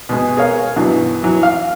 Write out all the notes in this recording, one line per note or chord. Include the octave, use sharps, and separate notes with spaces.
B2 G#3
G#4 A#4 C#5 F5
G2 B2 E3 F#3
E3 F#3
F5